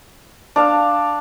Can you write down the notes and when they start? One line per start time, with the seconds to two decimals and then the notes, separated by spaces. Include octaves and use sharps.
0.56 D4 F5